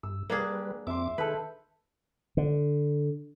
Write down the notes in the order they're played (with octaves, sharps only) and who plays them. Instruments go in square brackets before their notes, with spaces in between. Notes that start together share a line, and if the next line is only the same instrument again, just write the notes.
[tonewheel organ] G2 [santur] E6
[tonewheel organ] G3 B4 [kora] A#3 D4 G#4
[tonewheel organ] F2 C4 D6 [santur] E5 C6
[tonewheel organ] D#3 G#4 [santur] A4 G5 [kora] B4
[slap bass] D3